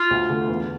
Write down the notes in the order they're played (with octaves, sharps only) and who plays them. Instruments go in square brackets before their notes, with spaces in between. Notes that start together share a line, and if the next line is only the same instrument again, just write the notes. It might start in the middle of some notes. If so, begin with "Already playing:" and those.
Already playing: [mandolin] F4
[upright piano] D2
D3 A3
E2